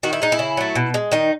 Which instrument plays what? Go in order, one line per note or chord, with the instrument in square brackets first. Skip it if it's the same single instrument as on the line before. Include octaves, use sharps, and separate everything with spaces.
[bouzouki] D#3 F#4
E4
G#3 D#4
E4
C#3
F#3 A3
B2
G#3
D#3 D#4